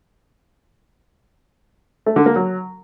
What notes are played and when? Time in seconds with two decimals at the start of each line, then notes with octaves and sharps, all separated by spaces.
2.06 A3
2.16 D3
2.26 A#3
2.36 F#3